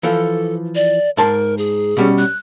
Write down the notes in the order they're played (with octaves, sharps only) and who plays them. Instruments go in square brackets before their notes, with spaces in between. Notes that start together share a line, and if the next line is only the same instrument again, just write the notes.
[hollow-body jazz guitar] E3 F3 [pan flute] A4
[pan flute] D5
[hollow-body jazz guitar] G#2 A5 C6 [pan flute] A#4
[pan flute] G#4
[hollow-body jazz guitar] B2 G3 C#4
[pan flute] F#6